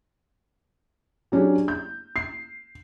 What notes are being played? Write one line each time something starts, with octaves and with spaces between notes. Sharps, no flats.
F#3 C#4 D4 G4 G#4
G6
C7